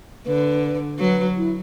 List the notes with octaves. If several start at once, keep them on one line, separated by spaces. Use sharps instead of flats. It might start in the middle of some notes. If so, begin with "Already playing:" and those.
D3 B4
F#3 B4
E4